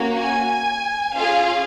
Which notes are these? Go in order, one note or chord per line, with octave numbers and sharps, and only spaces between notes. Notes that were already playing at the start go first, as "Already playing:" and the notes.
Already playing: A#3 C#4 F#4
G#5
C#4 F4 G#4 F5